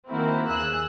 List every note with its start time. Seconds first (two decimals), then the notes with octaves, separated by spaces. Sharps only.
0.11 D#3 A#3 C4 E4 F#4
0.49 D#2 G#4 E6 F#6